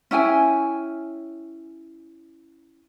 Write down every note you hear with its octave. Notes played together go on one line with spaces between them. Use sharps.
C#4 E4 G5 G#5